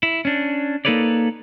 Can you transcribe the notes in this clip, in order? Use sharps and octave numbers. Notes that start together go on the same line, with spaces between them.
E4
C#4 D4
A#3 D#4 A4 B4 C#5 D5